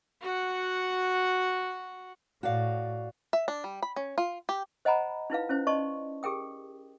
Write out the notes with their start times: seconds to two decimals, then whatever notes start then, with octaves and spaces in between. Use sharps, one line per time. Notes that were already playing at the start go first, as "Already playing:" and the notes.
0.21 F#4 F#5
2.43 A2 F#4 D5 F5
3.33 E5
3.48 D4
3.64 G3
3.82 B5
3.96 C#4
4.18 F4
4.49 G4
4.85 C5 D#5 F#5 G#5 A#5 B5
5.30 D#4 E4 B4 F5
5.49 C#4 E4 C5
5.67 D5 D#5 A5 C6 C#6
6.23 G4 G#4 A#4 G5 D#6